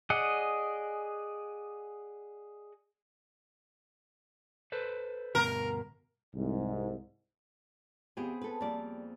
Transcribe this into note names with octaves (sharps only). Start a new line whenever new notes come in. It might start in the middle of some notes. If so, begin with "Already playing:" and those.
G#4 D5 D#5 F#5
A4 B4 C5
D2 G2 B2 A#4
C2 G#2
D#2 B3 C4 G4 G#4
A4 B4
F2 G3 A#3 D5